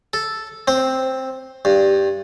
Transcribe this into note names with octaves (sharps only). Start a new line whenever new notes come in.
A4
C4
G2